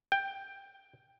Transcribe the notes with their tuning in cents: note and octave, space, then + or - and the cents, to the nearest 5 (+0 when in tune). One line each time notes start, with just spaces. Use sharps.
G5 +10